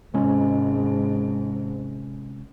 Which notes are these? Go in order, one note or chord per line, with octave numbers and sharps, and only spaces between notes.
G#1 G#2 C3 G#3 C#4